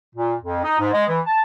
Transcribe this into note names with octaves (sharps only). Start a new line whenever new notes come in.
A#2
F2
D#4
G#2
G#3
E3
A5